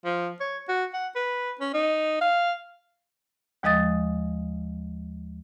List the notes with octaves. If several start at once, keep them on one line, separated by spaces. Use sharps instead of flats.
F3
C#5
F#4
F#5
B4
C#4
D#4
F5
D#2 F3 G#3 D#5 D#6 A6